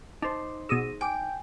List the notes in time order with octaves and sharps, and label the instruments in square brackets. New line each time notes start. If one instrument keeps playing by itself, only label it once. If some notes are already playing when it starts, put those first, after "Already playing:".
[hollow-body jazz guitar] D#4 C5 [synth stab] A5 [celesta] D6
[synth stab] B2 D#6 E6 [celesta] G#4 A#6 D#7
[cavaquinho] G5 [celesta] G#5 [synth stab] D6 D7